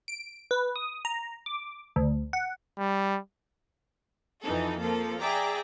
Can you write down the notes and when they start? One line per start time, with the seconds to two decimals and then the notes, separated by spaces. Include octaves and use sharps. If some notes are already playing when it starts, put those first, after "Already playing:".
0.08 D7
0.51 B4
0.76 D#6
1.05 A#5
1.46 D6
1.96 D2
2.33 F#5
2.78 G3
4.42 F2 E3 D#4 A4
4.79 F3 A#3 A4
5.20 G#4 D5 E5 G5 A#5 D6